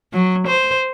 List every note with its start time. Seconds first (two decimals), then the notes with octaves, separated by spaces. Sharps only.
0.13 F#3
0.47 C5